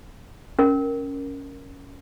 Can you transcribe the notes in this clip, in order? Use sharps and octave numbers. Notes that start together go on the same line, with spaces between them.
C#4 A#4